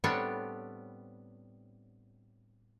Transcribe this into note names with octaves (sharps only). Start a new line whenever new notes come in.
A2 G3 B3 C4 D4 C#5